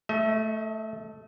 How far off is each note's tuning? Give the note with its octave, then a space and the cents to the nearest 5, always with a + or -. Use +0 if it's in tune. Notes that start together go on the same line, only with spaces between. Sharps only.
A3 +0 D#5 +40